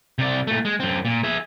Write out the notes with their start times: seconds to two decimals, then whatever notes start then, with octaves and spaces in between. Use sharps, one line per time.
0.19 C3 D5
0.47 A#2 A3
0.65 G#3
0.80 F#2 C4
1.05 A#2
1.24 G#4 E5